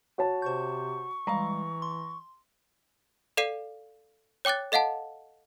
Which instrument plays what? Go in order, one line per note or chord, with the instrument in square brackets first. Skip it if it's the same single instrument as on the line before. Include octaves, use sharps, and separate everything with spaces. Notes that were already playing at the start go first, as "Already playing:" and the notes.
[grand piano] F#4 C#5 A5
[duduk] C3 [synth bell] C5 G6 [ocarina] C#6
[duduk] E3 [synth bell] G3 G#3 F5 [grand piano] A#5
[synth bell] C6
[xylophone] A4 D5 F5 C7 D#7
C#5 G5 D6 F#6 A6
A4 D#5 F5 F#5 A5